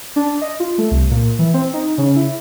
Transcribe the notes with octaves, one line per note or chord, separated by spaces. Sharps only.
D4
D#5
F4
A3
C2
A#2
E3
C4
D#4
C#3
E4